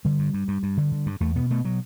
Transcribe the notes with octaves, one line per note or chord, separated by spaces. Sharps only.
D3 G3
G2
G2
G2
G2
D3
D3
G2
E2 A3
B2 B3
B2 A3
B2 F#3